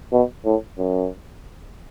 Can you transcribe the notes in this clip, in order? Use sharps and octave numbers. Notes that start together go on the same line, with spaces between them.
B2
A2
F#2